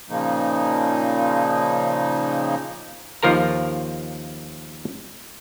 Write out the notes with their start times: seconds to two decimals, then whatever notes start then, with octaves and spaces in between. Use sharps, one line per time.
0.09 A#2 C#3 F3 A#3 D#4
3.23 D#2 F3 F4 A#4 A#5